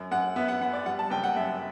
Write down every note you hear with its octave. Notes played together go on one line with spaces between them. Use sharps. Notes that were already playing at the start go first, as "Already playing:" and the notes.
Already playing: F#2
F#2 F#5
B3 E5
F#5
B3 F#5
D5
G3 F#5
A5
F#1 G5
F#5
F#2 E5